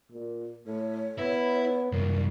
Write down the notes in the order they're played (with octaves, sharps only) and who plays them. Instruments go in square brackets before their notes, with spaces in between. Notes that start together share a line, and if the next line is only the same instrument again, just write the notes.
[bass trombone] A#2
[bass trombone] A2 [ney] C#5
[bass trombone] B3 [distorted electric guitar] E4
[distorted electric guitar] C2 F#2 [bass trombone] A#3